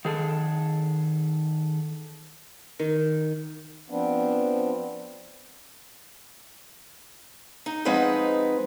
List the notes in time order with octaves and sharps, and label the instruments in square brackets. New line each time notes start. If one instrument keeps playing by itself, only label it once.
[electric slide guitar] D#3 G#4 A4
[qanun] D#3
[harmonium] F3 B3 C4 D4
[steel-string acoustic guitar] D#4
F3 G#3 C4 D#4 B4 F#5